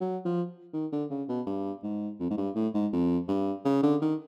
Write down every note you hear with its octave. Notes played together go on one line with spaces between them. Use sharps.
F#3
F3
D#3
D3
C#3
B2
G2
G#2
F2
G#2
G2
A2
G#2
F2
G2
C#3
D3
D#3